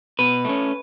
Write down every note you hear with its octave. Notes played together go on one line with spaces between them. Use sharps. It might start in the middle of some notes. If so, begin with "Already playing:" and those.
B2 B4
A3 C#4